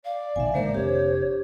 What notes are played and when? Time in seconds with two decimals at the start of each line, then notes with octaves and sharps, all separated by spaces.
0.05 D5 F5
0.36 A#1 B2 D#3 E5 G#5
0.54 A1 D3 D#3 G#3 A#3 A#4 C5
0.74 F1 C4 D4 G4 C#5